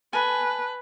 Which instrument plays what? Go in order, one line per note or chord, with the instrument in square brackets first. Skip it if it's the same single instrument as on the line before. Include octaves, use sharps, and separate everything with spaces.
[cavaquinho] A4 B5 [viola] B4 [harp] G#5